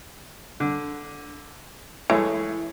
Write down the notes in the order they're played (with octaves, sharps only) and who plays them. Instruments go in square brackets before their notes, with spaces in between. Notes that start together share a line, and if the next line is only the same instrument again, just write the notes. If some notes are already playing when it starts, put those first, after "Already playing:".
[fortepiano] D3
[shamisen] E3 [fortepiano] G#3 A3 C#5